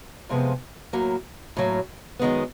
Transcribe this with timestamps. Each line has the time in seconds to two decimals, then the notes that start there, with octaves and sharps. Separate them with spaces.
0.29 F2 C3 F3 G#3 B3
0.93 A2 F#3 A#3
1.57 A2 F#3 A#3
2.19 F#2 D#3 G#3 B3